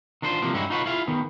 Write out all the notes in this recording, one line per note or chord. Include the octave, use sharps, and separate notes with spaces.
D#3 D4 E4 F4 C5
C3 E3 F3 A#3 D4
G2 F#3 G#3 C#4 D#4 E4
D#4 F4 F#4 B4 C#5
E4 F4 G#4 F5
D#3 B3